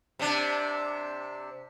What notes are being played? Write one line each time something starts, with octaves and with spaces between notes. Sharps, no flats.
C3 D4